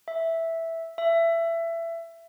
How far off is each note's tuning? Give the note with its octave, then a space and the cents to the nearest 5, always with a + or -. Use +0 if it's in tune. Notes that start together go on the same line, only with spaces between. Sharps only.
E5 -5
E5 +20